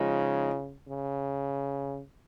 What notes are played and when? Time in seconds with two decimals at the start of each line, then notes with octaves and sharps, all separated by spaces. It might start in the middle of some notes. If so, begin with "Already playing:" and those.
Already playing: C#3 F3 G#3 D#4
0.88 C#3